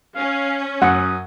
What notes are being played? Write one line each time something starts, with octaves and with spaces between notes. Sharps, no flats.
C#4 F5
F#2 F#5 D#6